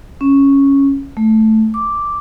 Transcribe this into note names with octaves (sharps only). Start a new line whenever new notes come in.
C#4
A3
D6